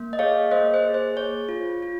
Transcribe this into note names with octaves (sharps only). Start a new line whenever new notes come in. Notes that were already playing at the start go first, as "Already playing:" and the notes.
Already playing: A#3
D#5
G#4 C#5 F5
A#3 C5 D#5
C5
G#4
C5
G#4 C#5
F4
F4